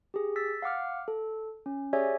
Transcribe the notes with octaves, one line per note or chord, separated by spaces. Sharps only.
G4 G#4
E6 A6 B6
F5 F#5 D6 F6
A4
C#4
G4 G#4 C#5 D5 E5 G#5